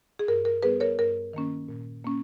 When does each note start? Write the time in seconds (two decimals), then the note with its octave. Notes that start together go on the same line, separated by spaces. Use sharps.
0.19 G#4
0.28 G2 A#4
0.45 A#4
0.63 G3 B3 G#4 B4
0.80 A#4 C#5
0.99 G2 A#4
1.33 D#3 A#3 C#4
1.69 A#2
2.04 A#3 C#4